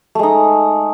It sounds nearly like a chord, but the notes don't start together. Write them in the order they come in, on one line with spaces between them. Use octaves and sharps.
A3 G#3 D#4